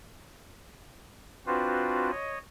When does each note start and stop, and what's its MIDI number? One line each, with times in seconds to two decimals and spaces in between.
1.46 2.11 60
1.46 2.11 62
1.46 2.11 65
1.46 2.11 66
1.46 2.11 71
1.46 2.11 72
2.11 2.38 73
2.11 2.38 75